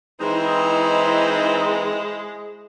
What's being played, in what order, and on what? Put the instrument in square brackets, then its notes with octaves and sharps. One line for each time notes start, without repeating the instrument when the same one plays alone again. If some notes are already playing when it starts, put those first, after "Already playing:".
[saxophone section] E3 C4 D#4 [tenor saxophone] G#3 [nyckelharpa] E4 C5